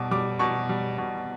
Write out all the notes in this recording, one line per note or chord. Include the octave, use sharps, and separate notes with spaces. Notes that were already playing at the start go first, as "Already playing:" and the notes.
Already playing: B2 G3 D6
G3 D6
B2 C#6
G3
B2